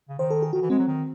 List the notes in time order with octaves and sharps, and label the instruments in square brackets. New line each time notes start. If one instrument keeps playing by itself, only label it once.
[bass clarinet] C#3
[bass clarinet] D#3 [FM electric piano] C5
[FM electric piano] A4
G#4
[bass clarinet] D#3 [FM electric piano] F#4
[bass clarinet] E3
[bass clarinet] G#3 [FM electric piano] C4
[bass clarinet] F#3
D#3